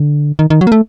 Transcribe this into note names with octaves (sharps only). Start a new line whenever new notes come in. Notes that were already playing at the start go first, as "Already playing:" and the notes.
Already playing: D3
D#3
D#3
F#3
A#3
A3